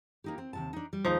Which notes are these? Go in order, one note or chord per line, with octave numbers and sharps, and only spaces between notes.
A#3 D#4 G4
C4
D#2 C3 A5
D4 D#4
G3
D#2 F3 G#3 D#4